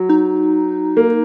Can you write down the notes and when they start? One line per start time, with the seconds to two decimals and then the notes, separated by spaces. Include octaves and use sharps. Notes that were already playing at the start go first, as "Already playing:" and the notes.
Already playing: F#3
0.09 D#4
0.97 A#3